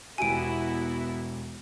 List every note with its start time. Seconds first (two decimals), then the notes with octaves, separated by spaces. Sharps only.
0.18 E1 B3 E4 F#4 G4 G#5 D7